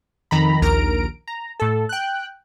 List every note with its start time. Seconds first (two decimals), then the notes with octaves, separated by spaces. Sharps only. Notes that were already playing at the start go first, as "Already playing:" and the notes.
0.31 F2 D#3 A#5 B5
0.61 A#1 D#2 A#4 A#5 D7
1.28 A#5
1.60 A2 A4
1.89 G5 F#6